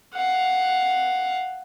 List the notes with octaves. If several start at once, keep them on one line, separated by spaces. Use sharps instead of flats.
F5 F#5